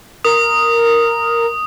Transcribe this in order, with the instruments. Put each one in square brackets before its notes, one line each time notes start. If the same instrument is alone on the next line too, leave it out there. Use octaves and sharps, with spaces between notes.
[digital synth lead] A#4 [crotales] D#6